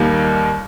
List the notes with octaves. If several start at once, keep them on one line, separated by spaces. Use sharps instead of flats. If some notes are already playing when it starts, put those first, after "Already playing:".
Already playing: D#2 D#3 G3 A#3